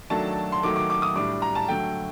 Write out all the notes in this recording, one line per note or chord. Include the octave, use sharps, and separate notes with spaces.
D#3 F#3 A3 D4 A5
C6
D#3 F#3 A3 D6
D6
D6
D#6
A2 G3 D4 D6
A#5
A5
D3 F#3 A3 G5